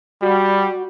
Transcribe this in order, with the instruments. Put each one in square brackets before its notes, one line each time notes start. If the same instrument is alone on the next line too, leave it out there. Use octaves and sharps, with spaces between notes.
[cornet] G3 [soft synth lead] F#4